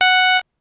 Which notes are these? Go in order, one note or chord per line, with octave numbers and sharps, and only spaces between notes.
F#5